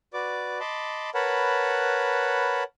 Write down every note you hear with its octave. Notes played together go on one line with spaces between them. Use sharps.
F#4 B4 D5 D6
D#5 A5 B5 C6 D6
A#4 B4 C#5 F#5 A5 B5